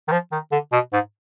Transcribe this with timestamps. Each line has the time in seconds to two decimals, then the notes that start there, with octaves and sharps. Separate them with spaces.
0.08 D#3
0.12 F3
0.32 D#3
0.52 D3
0.72 B2
0.93 G#2